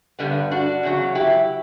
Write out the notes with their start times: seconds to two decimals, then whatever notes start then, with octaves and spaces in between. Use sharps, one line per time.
0.19 G2 D3 G3 B3
0.51 D4 F#4
0.83 E2 C#3 F#3
1.15 E4 G4